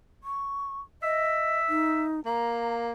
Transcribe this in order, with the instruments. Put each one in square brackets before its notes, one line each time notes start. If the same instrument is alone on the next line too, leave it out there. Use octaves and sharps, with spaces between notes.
[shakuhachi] C#6
[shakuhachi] D#5 [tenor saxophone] E5
[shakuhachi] D#4
[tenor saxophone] A#3 [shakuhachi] A#5